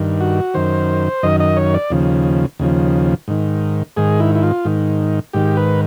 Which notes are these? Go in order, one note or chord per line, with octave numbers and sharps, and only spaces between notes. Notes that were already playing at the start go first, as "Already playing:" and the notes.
Already playing: G2 D#3
F#4
F#2 D#3 C5
F#2 D#3 D#5
D#5
C#5
D5
D#2 C#3 F3
D#2 C#3 F3
G#2 D#3
G#2 D#3 G#4
E4
E4
F4
G#2 D#3
G#2 D#3 G4
B4